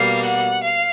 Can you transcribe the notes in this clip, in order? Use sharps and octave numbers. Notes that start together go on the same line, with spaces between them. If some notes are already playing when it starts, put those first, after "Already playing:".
Already playing: B2 G3 A#3 F5
F#5
F5